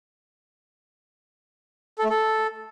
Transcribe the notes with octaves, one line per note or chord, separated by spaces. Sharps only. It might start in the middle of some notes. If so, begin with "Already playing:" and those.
A4
A3
A4